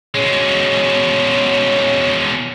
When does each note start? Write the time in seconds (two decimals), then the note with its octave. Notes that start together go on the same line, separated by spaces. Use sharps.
0.15 B2 G#3 C#4